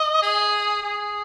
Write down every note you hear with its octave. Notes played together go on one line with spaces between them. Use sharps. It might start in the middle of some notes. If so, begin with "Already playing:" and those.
Already playing: D#5
G#4
G#4